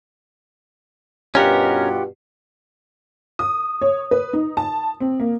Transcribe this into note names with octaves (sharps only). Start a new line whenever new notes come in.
G2 B2 C#4 F4 G4 A#4 F#5
D#6
C#5
B4
D#4
A5
C4
A#3